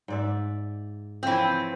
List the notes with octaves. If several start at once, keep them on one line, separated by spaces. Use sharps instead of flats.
G#2 D5 E5
E3 F3 C4 C#5